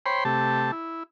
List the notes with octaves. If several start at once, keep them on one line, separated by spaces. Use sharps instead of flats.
C5 C#5 G5 B5 C6
C3 A3 G4 A5
E4